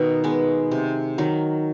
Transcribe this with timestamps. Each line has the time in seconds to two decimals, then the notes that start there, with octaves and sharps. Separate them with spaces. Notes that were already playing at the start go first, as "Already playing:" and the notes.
Already playing: B2 D#3 D#4
0.24 G#3 B3
0.71 C3
1.18 D#3 F#3